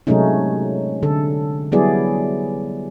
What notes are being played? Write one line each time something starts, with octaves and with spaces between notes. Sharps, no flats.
C3 F#3 G#3 A3 C#4 D#4
D3 A4
F#3 G3 B3 E4 G#4 D5